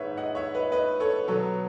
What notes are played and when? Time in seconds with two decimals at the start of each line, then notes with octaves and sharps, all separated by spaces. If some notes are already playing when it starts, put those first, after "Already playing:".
Already playing: G#2 D#3 G#3 B4 C#5 E5
0.17 D#5 F#5
0.35 C#5 E5
0.54 B4 D#5
0.72 B4 D#5
1.00 A4 C#5
1.28 B2 F#3 B3 A4 C#5